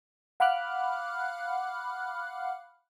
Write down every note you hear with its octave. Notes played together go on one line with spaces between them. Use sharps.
F5 F#5 B5 D6 F6 F#6